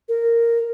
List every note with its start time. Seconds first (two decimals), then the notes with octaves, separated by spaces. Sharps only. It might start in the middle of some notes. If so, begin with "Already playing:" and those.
0.08 A#4